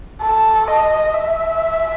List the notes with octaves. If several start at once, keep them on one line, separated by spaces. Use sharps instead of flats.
A4
D#5
E5